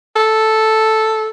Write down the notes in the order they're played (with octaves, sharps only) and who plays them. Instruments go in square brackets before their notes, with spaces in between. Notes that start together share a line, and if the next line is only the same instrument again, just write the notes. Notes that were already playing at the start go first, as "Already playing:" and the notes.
[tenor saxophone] A4